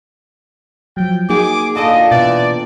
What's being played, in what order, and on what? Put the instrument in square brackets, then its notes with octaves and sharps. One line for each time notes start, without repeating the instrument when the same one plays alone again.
[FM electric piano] F3 F#3 [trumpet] G5
[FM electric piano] A#3 D#4 F#4 [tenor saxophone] G#4 [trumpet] D6
[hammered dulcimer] A#2 D3 A5 [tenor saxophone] A4 [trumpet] D#5
[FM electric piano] B2 G5 A6 [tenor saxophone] E3 [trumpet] D5